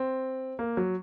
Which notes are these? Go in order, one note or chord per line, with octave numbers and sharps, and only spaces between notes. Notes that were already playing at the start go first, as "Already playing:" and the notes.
Already playing: C4
A#3
F#3